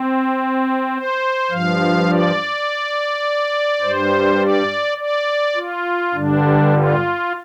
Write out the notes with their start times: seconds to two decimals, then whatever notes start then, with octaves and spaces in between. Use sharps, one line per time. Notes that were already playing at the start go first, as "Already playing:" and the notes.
Already playing: C4
0.93 C5
1.50 G2 F3 F5
2.09 D5
3.81 G2 G3 C5
4.40 D5
4.98 D5
5.55 F4
6.13 G2 D3 G3 D4
6.72 F4